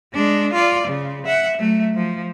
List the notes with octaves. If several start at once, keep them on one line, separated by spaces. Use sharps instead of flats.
G#3 D4
F4 D5
C#3
E5 F#5
F#3 A3
F3